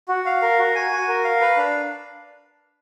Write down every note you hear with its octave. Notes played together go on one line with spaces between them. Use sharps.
F#4
F5
A#4
F#4
G#5
F#4
A#4
F5
B4
D4